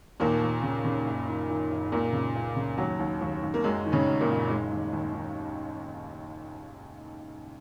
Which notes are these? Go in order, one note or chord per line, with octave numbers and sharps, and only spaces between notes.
D#2 A#2 A#3
D#2
C#3
C#3
F#1
D#3
D#3
F#1
C#2 A#2 A#3
C#3
C#2
C#3
D#2 F#3
D#2
D#2
D#2
A#3
F#2 G#3
D#3
C#3 C#4
F#2
A#2 A#3
F#1
D#3 G#3
D#2
D#2
D#3